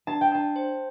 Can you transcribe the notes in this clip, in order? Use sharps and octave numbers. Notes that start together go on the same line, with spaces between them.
D4 A5
G5
D4 A5
C5